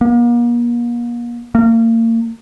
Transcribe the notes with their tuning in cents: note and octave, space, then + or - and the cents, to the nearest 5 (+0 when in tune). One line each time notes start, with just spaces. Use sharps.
A#3 +40
A#3 -35